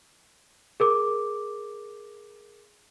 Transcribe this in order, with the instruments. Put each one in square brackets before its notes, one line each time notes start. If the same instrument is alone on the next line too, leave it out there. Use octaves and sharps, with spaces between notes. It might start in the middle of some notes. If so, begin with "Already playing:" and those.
[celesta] G#4 A#4 D6